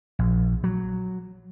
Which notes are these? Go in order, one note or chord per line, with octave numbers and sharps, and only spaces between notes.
A#1
F#3